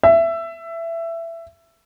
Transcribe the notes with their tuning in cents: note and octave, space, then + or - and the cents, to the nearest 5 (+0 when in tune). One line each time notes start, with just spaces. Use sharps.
E5 +15